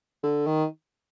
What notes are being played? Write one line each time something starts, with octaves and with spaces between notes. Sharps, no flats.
D3
D#3